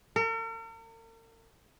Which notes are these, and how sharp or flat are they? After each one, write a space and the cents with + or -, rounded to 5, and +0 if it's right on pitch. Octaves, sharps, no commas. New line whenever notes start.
A#4 -45